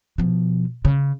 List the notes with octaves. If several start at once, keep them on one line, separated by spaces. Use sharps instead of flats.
B2 F3
C#3